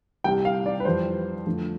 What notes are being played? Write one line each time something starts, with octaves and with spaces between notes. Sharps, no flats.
C2 C3 G3 G5
F5
D5
B4
F2 E3 G3 C5
F2 D3 F3 A3